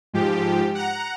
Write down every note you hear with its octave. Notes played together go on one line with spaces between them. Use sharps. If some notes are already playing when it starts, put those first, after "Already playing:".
G#2 F3 G4
F#5 A#5